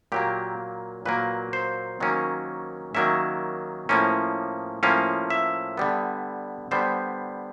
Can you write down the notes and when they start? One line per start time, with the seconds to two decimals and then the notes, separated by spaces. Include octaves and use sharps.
0.12 A#2 F#3 A#3 G4
1.06 A#2 F#3 A#3 B4
1.53 C5
2.00 D#3 F#3 A#3 C#4
2.95 D#3 F#3 A#3 C#4 E5
3.89 A2 F3 A#3 C#4
4.83 A2 F3 A#3 C#4 F5
5.30 E5
5.78 D3 G3 B3
6.71 D3 G3 B3 C5